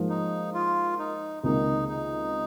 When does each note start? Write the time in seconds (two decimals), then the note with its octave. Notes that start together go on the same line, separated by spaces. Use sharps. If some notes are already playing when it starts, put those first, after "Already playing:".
Already playing: G#2 F3 A#3
0.10 D#4
0.54 F4
0.99 D#4
1.43 C#2 C3 D#3 A#3 D#4
1.89 D#4